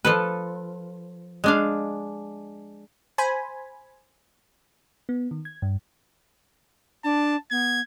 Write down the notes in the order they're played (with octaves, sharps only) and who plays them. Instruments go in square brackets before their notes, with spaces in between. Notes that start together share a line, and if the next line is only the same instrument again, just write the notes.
[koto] F3 A4 B4
G#3 D4 F5
[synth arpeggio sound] C5 G#5 B5
[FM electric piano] B3
D#3
G#6
G2
[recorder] D4 [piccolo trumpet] A5
[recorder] B3 [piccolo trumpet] G#6